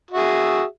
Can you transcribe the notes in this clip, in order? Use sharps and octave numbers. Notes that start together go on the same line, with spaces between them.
F#4 G#4 E5